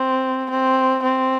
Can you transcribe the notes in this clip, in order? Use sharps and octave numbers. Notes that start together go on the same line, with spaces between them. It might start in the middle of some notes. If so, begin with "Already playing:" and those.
Already playing: C4
C4
C4